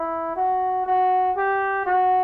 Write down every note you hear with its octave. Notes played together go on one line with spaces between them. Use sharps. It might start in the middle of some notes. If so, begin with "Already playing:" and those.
Already playing: E4
F#4
F#4
G4
F#4